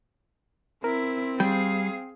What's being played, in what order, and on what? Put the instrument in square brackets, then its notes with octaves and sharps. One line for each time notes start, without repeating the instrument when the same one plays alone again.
[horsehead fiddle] C4 [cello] E4 [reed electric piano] A#4
[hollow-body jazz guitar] G3 [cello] G#4 F5 [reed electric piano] G5